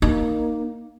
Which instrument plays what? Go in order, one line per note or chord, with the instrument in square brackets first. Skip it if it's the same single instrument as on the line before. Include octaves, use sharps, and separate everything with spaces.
[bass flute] A#3 [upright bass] D#4